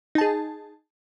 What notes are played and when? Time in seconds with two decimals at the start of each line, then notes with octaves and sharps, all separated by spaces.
0.15 D#4
0.18 A5
0.21 G#4